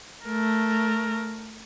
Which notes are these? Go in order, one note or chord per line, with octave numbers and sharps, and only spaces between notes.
A3 A#4